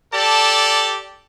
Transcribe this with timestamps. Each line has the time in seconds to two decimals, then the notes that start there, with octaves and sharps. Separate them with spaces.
0.13 G4 A4 D5 A5